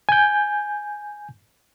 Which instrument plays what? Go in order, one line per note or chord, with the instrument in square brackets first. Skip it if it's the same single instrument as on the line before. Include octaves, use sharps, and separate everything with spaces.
[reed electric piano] G#5 G6